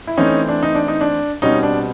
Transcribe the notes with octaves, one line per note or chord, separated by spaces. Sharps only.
E4
E3 A3 C4 C#4 D#4
D4
D#4
D4
D#4
D4
B2 G3 C4 C#4 D#4
D4